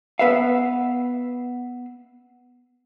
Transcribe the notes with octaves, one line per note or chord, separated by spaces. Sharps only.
B3 B4 E5 F5